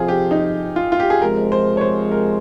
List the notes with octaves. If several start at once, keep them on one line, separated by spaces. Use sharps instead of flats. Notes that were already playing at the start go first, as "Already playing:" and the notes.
Already playing: F2 C3 F3 F4 G#4
G4
D#4
F4
F4
G4
G#4
C3 F3 G#3 A#4
C5
C#5
C5
A#4